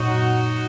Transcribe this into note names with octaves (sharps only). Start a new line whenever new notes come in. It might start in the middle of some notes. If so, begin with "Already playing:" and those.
Already playing: F#2 A#2 F#3 D#4 F#4